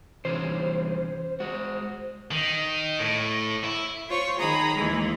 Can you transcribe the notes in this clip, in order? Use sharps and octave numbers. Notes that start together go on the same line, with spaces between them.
C2 E3 C#4 C5
G#3 F#4
D#3
A2
E4
F4 C5 C#5 C#6
D#3 G#4 A#5 B5 D#6
D#2 E3 G#3